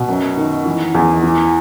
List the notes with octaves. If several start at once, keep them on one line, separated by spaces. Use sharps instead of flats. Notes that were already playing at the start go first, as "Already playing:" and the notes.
Already playing: B2
F#2
D#3
E3
E2
E3